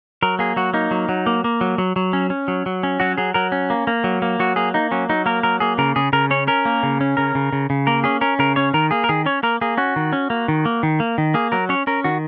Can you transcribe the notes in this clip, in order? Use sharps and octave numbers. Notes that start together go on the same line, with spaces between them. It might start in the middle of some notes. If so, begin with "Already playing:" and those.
F#3 A#4
A#3 G#4
F#3 F#4
A#3 D#4
F#3
F#3
A#3
A#3
F#3
F#3
F#3
C#4
C#4
F#3
F#3
C#4
F#3 F#4
F#3 G#4
F#3 A#4
C#4
A#3
A#3
F#3
A#3
F#3 F#4
A#3 G#4
A#3 D#4
F#3 C#4
F#3 D#4
A#3 A#4
F#3 A#4
A#3 G#4
C#3 A#4
C#3 G#4
C#3 A#4
C#4 C#5
C#4 A#4
A#3
C#3
C#4
C#3 A#4
C#3
C#3
C#3
A#3 A#4
C#4 G#4
C#4 A#4
C#3 A#4
C#4 C#5
D#3 A#4
A#3 G#4
A#4
D#3 G#4
C#4 C#5
A#3 A#4
A#3 G#4
C#4 F#4
D#3
C#4
A#3
D#3
A#3
D#3
A#3
D#3
A#3 G#4
F#3 A#4
C#4 C#5
C#4 A#4
D#3 F#4